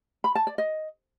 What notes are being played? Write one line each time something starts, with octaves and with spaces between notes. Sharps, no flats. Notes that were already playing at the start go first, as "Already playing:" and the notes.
B5
A5
D5
D#5